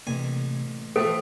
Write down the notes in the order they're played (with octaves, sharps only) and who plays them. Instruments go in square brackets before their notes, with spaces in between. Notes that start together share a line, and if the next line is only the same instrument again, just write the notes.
[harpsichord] A1 G#5 [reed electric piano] C3 A#3
[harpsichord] A2 E3 F3 [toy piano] A4 [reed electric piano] C5